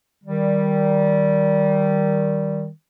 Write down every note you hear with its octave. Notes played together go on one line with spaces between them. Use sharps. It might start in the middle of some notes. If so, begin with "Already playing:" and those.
D#3 G3